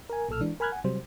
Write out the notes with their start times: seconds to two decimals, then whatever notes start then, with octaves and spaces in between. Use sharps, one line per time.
0.09 A#4 G#5
0.29 B1 A#2 A4 E6 F6
0.41 E3 G#3 D4
0.60 A#4 G#5 B5 F6 F#6 G#6
0.72 F#5 G#5
0.84 C3 F#3 G3 C5